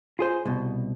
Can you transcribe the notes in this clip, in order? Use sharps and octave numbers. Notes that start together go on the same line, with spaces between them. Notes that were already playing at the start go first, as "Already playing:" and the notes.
F4 G#4 C5
C2 B2